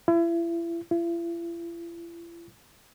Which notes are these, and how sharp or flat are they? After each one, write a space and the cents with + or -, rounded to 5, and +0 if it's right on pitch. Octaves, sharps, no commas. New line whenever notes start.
E4 +35
E4 +45